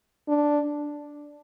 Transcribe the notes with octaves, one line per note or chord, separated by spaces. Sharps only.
D4